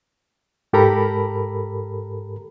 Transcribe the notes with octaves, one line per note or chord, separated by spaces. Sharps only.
G#2 G4 A4 A#4 A#5 B5